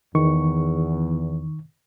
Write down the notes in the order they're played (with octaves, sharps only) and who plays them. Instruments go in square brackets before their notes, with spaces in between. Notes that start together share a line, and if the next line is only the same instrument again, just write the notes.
[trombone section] E2 [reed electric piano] D#3 C#6